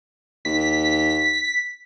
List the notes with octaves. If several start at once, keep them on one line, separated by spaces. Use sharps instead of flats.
D#2 B6